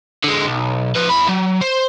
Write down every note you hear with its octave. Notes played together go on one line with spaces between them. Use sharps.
D3 G#3
B1
F3 B4
E2 B5
F#3
C5